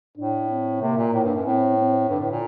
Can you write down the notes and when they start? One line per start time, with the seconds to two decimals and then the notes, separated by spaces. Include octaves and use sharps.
0.17 A2 D4
0.50 C4
0.81 C3 A#3
0.98 A#2
1.13 A2
1.24 G2
1.35 F#2
1.45 A2 C4
1.77 C4
2.09 G2 D3
2.20 A2
2.31 A#2